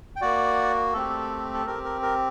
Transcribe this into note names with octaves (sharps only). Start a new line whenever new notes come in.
G5
A#3 F#4 D5 F#5
A3 C4 G4 A4
A4
C4 G4 A#4
A#4
A#4